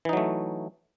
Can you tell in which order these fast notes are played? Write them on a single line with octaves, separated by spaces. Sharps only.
E3 D#4 F#3 A3